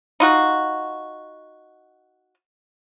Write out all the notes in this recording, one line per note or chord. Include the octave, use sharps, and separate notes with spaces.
D#4 F4 F#4